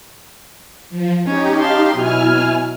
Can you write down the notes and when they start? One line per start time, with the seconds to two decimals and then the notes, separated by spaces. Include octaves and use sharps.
0.90 F3
1.25 C#4 D#4 G4
1.59 F5 A5 C6
1.94 B2 F#3 E4 G#5 F6